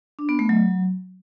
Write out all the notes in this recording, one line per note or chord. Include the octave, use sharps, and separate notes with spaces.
D4
B3
A3
F#3